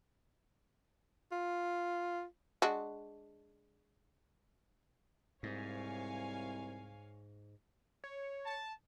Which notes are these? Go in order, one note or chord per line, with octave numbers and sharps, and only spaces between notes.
F4
G#3 D4 F#4
C2 G#2 C#5 F5 G#5
C#5
A5